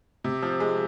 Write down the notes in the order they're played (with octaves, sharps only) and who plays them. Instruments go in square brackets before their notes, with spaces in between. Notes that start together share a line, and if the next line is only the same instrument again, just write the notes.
[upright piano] C3
F3
G#3